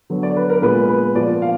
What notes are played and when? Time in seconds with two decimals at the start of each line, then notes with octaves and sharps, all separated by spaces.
0.10 D3 F#3 B3
0.23 D5
0.36 B4
0.50 A#4
0.62 A#2 G#3 B3 B4
0.89 B4
1.15 A#2 F3 B3 D5
1.42 F5